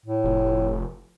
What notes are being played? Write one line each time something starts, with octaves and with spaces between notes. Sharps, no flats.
A2
F1